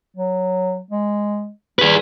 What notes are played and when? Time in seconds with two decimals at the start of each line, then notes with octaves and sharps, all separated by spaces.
0.16 F#3
0.91 G#3
1.79 G3 G#4 B4